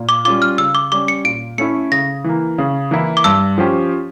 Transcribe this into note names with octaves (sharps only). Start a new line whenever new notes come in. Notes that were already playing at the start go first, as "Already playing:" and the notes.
Already playing: A#2
D6
G3 C#4 F4 D6
F6
C#3 E6
D6
G3 C#4 D6
C#7
A#2 D7
A3 C#4 E4 C#7
C#3 A#6
E3 A#3
C#3
E3 A#3 E4
D6
G2 E6
F3 C#4 G4